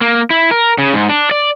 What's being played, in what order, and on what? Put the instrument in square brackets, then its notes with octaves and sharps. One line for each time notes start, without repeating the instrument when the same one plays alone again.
[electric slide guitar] A#3
E4
A#4
C#3
G#2
D4
D5